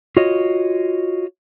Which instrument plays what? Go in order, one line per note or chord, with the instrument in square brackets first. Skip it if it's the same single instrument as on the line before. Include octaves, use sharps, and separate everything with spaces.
[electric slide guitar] F4 F#4 C#5 D#5